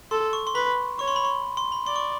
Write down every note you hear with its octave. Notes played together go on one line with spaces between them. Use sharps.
A4 C6
C#6
C6
B4 B5
C#5 C#6
C6
B5
C6
C6
B5
D5 C6
C#6